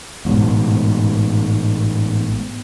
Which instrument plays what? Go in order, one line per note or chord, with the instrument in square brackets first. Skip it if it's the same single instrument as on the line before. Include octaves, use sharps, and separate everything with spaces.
[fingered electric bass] A1 G#2 B2